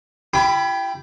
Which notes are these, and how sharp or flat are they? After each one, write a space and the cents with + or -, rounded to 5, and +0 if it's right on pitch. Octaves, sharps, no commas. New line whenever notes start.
E4 +40 G4 +0 B5 +0